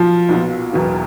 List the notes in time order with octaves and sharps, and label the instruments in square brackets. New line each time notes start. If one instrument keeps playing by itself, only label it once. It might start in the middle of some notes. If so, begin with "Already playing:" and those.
Already playing: [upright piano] B1 A#2 F#3 [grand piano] F3
[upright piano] B1 A#2 F#3 B3
E1 E2 B2 F#3